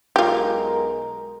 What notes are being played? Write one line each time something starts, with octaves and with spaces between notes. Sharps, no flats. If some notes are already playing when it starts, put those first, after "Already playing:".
B1 G#3 F4 G4 A#4